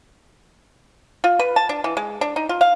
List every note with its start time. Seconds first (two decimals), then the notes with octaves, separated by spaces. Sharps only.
1.24 F4
1.39 B4
1.56 A5
1.69 D4
1.84 E3
1.97 G#3
2.21 D4
2.36 D#4
2.49 F4
2.61 F5